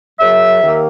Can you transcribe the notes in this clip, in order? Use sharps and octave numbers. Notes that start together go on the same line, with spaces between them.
F#2 C#3 F#3 E5
D#2 D#3 A#3